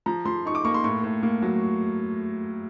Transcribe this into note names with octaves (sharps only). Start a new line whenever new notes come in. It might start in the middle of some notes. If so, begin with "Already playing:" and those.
F3 A#5
F3 C6
D#4 C#6
D6
A#3 C#6
C6
A2 C#6
A2
A#3
F#3